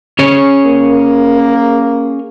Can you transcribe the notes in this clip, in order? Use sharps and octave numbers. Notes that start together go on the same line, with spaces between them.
C#4 G#4 C#5
A#3